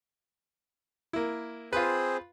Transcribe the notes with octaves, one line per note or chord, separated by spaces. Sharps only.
A#3 E4
C4 F4 G#4 B4 C5